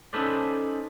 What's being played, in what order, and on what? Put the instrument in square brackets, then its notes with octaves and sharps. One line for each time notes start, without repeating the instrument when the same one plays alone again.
[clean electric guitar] C#4 D#4 A4 B4 C5 D5